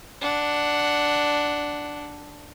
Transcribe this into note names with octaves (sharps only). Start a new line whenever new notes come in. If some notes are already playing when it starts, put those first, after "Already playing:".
D4 F#5